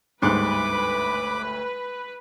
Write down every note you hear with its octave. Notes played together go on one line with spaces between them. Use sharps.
G1 D2 G#2 G3 B4 D6 F#6